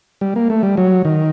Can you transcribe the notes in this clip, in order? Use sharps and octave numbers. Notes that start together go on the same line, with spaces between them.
G3
A#3
A3
G3
F#3
D#3